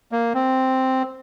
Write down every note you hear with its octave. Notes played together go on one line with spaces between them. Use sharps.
A#3
C4